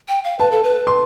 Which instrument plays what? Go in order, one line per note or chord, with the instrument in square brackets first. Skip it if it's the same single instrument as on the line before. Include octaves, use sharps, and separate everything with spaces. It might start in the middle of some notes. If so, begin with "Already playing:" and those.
[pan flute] G5
F5
[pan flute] B4 [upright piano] A5
[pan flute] A4
B4
[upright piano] C6